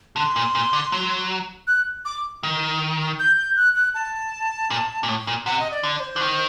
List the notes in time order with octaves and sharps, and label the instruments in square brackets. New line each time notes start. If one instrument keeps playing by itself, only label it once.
[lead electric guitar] D3 [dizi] C6
[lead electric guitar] A#2
A#2
D3
F#3
[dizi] F#6
D6
[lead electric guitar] D#3
[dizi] G6
G6
F#6
F#6
A5
[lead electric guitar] A#2
A#2
A2
A#2
[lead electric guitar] C3 [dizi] F#5
[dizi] D#5
D5
[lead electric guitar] D3
[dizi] D5
C5
[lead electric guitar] D3
D#3